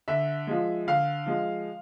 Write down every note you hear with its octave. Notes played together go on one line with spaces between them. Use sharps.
D3 E5
F3 G#3
D3 F5
F3 G#3